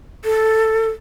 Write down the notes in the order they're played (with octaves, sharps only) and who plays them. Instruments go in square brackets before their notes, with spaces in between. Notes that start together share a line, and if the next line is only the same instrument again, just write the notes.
[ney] A4